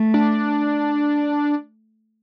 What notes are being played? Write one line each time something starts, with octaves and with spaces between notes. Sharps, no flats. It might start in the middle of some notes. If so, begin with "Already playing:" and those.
Already playing: A3
D4